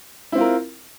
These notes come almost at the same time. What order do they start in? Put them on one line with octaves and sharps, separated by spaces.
E4 C4 F4 A#4